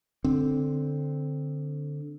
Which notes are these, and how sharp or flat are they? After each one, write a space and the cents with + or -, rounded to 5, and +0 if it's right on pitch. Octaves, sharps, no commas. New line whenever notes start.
D3 +0 C4 +0